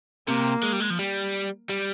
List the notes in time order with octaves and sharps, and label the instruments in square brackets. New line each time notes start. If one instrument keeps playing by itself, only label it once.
[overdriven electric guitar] C3 [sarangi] A#3
[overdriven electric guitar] G#3
G3
G#3
F3
G3
G3